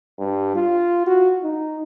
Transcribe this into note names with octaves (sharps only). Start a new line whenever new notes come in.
G2
F4
F#4
D#4